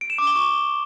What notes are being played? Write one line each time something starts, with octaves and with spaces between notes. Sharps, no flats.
D7
E7
D6
G7
C#6